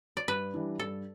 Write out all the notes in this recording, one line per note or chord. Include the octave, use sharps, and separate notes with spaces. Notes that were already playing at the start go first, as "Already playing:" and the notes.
D5
G2 B4
E3 G3 D4
G2 A4